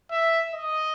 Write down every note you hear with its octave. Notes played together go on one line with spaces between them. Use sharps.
E5
D#5